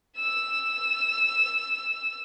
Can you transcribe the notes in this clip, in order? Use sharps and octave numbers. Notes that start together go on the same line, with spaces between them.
E6 E7